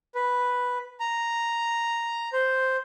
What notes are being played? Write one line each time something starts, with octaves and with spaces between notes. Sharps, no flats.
B4
A#5
C5